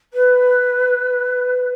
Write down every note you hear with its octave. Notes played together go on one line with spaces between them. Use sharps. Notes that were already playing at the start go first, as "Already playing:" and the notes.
B4